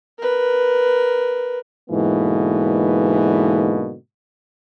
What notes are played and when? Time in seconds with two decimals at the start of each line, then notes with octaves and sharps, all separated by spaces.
0.19 A#4 B4
1.90 G#2 B2 D3 E3 A#3